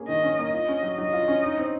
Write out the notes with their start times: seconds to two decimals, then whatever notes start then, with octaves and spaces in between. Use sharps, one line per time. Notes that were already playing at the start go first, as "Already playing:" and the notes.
Already playing: A#3 C#4 G#4
0.09 D#3 D#5
0.23 C#4
0.39 A#3
0.53 F4 D#5
0.68 C#4
0.83 F#3
0.98 F#3 D#5
1.13 F4
1.28 C#4
1.43 D#4
1.57 C4